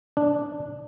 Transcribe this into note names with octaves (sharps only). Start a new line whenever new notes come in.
D4